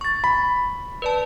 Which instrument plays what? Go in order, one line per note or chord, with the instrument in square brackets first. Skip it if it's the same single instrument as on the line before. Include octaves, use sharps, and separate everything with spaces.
[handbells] C#6 A6
[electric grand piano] B5
[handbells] B4 D5 A5